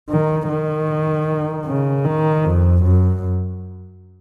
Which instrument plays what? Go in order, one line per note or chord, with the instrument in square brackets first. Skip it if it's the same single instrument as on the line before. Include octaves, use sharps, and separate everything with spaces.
[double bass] D#3
D#3
C#3
D#3
F2
F#2